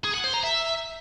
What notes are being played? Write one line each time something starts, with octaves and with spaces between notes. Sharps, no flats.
G#4
F#5
C5
A#5
E5